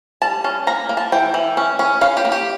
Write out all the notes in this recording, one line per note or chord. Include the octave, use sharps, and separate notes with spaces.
G3 A5
C#4 A5
A#3 A#5
A#3
A5
E3 G5
E3
C#4
C#4
C#4 F5
G4
A#3
G4